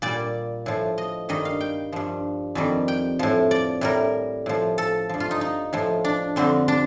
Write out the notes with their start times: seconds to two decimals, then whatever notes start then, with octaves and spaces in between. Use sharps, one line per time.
0.02 A#2 G3 D5
0.66 A2 F3
0.98 D#5
1.29 G2 D#3 G3 D#5
1.45 F5
1.61 G5
1.93 G2 F3
2.55 F2 D#3 G3
2.88 G5
3.19 A2 F3
3.51 D5
3.81 A2 G3 A#4
4.46 A2 F3
4.78 A4
5.09 G2 F3
5.20 F4
5.31 D#4
5.41 D#4
5.73 A2 F3
6.05 D4
6.36 F2 D3 G3 C4
6.68 D4